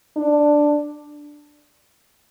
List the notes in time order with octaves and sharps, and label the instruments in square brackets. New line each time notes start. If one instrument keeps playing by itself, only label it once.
[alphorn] D4